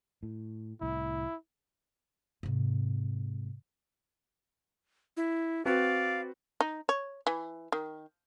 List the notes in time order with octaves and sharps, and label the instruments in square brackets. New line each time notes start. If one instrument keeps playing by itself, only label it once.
[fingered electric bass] A2
[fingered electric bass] C2 A2 [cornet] E4
[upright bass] G#2 C3
[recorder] E4
[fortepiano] C4 F#4 B4 [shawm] D5 [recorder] F5
[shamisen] D#4
C#5
E3
D#3